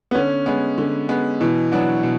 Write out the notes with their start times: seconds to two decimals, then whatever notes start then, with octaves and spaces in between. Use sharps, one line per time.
0.11 B3
0.15 D3 C#4
0.46 G#3 B3
0.78 D3
1.09 G#3 B3
1.40 B2 E3
1.72 F#3 B3 D4 F#4
2.03 B2